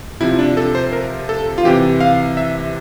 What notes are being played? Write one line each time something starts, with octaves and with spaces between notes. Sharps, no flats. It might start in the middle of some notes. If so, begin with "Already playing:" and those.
C3 F3 E4
D4
A4
C5
A#4
A4
F4
C3 E3 G4
F5
E5